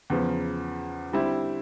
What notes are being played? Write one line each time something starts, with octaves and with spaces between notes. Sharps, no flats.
E2 C#3 F3
D3 G3 C4 E4